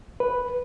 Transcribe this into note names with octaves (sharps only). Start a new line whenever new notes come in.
B4